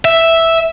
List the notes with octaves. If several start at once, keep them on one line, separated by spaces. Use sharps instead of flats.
E5